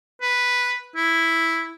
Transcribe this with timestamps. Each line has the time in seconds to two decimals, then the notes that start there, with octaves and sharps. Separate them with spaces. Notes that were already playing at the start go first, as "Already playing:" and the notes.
0.21 B4
0.96 E4